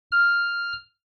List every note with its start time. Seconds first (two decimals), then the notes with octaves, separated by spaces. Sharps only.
0.12 F6